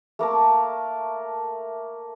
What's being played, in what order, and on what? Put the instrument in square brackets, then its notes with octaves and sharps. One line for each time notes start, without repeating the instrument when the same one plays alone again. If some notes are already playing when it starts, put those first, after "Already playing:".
[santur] A3 A#3 A#4 A5